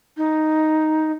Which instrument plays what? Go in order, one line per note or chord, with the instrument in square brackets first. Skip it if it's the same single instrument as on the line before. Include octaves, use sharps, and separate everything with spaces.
[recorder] D#4